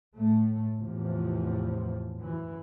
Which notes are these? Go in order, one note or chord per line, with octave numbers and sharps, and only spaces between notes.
A2 A3
E2 A2 C3 F3
F#2 E3